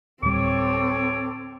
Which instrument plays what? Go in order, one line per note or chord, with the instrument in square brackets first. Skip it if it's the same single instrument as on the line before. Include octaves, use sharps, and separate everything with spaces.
[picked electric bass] D1 G3 [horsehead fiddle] C4 A4 [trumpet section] C#5 [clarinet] D6